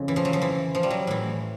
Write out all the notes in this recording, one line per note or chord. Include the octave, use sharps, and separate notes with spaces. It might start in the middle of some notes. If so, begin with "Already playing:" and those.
Already playing: F2 C#3
E3
F3
F#3
F3
E3
F3
G3
F#3
A2 E3